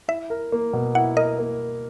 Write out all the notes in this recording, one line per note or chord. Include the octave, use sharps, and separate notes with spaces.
E4 E5
A#4
A#3
B2
E4 F#5
A#4 D#5
A#3